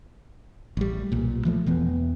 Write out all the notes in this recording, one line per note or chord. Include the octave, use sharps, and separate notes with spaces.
A1 G3
B1 A#2
E3 F3 A3
E1 E3 B3